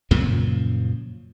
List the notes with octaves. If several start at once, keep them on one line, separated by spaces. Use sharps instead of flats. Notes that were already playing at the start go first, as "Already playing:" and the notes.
F#2 A#2 C#3 F3